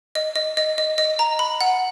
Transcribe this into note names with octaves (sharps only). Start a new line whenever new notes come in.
D#5
D#5
D#5
D#5
D#5
A#5
B5
F#5